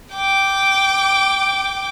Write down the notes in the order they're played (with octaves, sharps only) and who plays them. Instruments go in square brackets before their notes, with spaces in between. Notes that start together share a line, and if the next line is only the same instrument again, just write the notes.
[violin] G5 D6